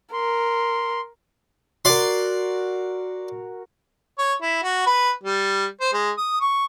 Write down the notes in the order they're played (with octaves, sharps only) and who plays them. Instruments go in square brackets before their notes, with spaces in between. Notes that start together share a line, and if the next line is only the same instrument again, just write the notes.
[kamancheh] A#4 [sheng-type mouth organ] C6
[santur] F#4 A#4 [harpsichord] D5 C6
[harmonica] C#5
E4
F#4
B4
G3
C5
G#3
D#6
C#6